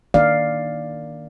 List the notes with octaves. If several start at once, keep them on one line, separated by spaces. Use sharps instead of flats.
D#3 A#3 D4 D5 F5